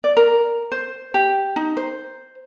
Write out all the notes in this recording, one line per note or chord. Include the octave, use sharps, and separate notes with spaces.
D5
A#4
C5
G4
D#4
C5